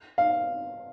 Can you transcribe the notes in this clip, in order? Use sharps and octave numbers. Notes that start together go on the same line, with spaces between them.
F5